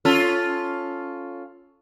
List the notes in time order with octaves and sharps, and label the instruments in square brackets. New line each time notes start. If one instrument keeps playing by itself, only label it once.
[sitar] C#4 F4 A4